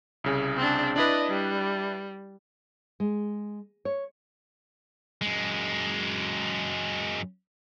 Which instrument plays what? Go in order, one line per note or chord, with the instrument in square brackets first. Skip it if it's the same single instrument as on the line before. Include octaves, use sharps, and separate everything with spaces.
[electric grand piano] C2 C#3 G#4
[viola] C4 D4
[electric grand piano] D4 E4 B4 [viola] D5 D#5
[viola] G3
[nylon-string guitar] G#3
C#5
[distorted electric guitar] F#2 G#3